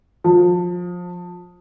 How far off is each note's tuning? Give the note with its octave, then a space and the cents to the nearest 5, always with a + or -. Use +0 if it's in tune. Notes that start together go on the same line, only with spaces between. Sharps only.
F3 +25